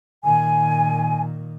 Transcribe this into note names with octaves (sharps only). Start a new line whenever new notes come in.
A#2 D#3 G#5